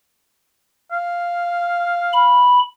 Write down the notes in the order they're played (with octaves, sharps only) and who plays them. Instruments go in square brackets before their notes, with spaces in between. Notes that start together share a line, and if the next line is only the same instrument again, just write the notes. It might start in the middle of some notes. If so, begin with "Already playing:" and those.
[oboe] F5
[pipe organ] B5